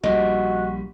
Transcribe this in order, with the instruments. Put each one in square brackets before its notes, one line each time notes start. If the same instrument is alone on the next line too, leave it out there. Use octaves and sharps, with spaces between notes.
[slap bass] A#1 G3 [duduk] F#4 [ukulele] D#5